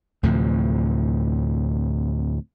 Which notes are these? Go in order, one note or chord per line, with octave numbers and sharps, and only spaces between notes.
D2 A2 C3 F3